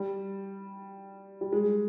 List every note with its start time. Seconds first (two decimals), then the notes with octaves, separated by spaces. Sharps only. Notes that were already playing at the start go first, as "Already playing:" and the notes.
Already playing: G3
1.41 G3
1.53 G#3